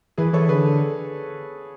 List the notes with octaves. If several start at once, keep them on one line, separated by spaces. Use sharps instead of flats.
E3 G#4 B4
E3 A4 C#5
D3 G#4 B4